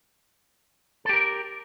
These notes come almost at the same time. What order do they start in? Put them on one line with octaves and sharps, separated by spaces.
A4 G4 A#4